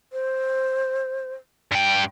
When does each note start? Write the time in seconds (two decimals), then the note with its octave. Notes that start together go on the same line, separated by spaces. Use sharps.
0.13 C5
1.72 G2 G5